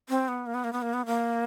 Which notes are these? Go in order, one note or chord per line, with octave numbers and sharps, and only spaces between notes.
C4
B3
A#3
B3
A#3
B3
A#3
B3
A#3